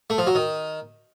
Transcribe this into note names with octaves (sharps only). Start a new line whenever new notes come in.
A3
F3
F#3
D#3